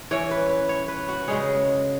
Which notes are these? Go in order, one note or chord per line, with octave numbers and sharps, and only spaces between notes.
E3 C#4 C#5
B4
B4
C#5
B4
F#4
C#3 G#3 C#4 G#4